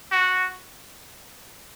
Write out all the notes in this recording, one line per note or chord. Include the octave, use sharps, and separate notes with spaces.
F#4